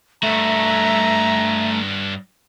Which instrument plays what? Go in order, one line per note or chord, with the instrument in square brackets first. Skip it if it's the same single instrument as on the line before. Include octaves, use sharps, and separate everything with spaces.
[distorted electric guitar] G2 F#4 [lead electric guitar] A3 [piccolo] E5 [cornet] A#5